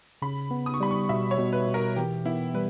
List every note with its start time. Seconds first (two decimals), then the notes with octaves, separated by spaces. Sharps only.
0.22 C#3 B5
0.51 B3
0.66 D#6
0.74 C#6
0.80 G3 B5
0.91 C#6
1.09 B2 E5
1.31 C#5
1.38 B2
1.53 B4
1.67 B2
1.74 A#4
1.96 E3 G4
2.25 B3 E4
2.54 G3 B4